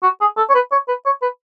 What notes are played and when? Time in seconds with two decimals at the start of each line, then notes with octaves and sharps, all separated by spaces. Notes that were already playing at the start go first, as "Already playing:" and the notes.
0.03 F#4
0.21 G#4
0.37 A4
0.49 C#5
0.55 B4
0.72 C#5
0.88 B4
1.06 C#5
1.22 B4